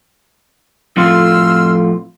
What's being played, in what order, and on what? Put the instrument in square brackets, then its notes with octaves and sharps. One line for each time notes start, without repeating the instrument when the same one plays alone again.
[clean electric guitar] F2 A2 F4 [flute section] C6 E6 F6